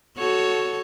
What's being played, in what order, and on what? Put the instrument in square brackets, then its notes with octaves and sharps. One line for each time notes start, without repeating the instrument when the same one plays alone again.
[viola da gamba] F#4 A4 C#5